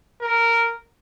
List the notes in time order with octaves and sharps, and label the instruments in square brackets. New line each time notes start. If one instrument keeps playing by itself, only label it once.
[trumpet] A#4